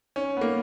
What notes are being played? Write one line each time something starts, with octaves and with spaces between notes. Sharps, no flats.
C#4
B3
A#3